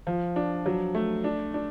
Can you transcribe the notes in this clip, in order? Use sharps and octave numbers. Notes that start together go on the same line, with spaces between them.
F3
D4
F#3
A3
D4
D4